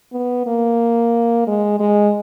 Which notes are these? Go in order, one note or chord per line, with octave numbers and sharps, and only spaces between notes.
B3
A#3
G#3
G#3